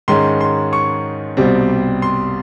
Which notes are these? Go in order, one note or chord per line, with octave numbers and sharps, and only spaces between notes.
G#2 D#3 G#3 C#4 C6
C6
C#6
C2 B2 G3 C4
C6